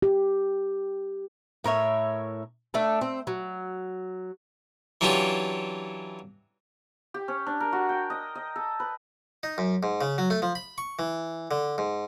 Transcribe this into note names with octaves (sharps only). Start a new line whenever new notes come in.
G4
A2 A#4 C#5 E5
A3 D4 A4
C4
F#3
E3 F#3 C#4 D4 F4 G4
G4
C#4
D4
A#4
F#4
G5
D#5
D#5
A4
B4
D#4
F#2
G#2
C#3
F#3
A3
F3
B5
C#6
E3
D3
G#2